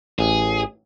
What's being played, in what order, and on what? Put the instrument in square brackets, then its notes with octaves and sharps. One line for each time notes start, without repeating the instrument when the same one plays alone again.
[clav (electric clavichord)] A1 [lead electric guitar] G#4